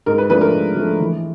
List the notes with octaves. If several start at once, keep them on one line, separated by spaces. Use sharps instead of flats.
G#2 A#4
B4
F3 A3 D4 B4
A#4
G#2
F3 A3 D4
E3